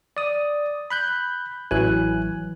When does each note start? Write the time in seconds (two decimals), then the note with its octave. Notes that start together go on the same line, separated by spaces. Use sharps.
0.17 D5 D#6
0.90 B5 F#6 G6
1.71 A1 E3 F#3 G#5 F#6